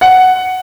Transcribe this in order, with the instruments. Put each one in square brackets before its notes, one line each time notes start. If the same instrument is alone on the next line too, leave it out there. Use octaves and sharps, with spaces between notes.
[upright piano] F#5